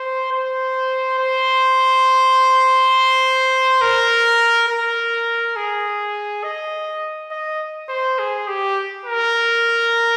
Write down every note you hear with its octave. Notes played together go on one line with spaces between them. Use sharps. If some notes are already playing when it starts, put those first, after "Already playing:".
Already playing: C5
C5
C5
A#4
A#4
G#4
D#5
D#5
C5
G#4
G4
A#4